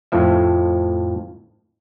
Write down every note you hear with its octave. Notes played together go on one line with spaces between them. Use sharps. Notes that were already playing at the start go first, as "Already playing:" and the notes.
F2 A2 F3 E5